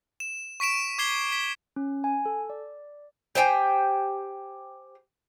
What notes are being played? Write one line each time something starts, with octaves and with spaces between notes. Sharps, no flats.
E7
C#6 B6 D7 E7
D6 G#6 C7 G7
B6
C#4
G#5
A4
D5
G4 C5 G5 G#5